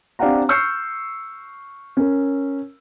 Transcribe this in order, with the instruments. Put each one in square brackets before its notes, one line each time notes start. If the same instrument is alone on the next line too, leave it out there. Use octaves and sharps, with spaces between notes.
[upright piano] C4 D4 G4 F5 F#5 A#5
C#6 E6 F6 G6 C7 C#7
C#4 A#4